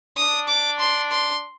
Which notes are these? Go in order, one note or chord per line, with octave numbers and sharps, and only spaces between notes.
D4 D#6
D6
C6
C6